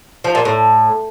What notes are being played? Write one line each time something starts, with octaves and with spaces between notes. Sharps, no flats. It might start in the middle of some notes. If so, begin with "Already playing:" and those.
F3
A#2
A2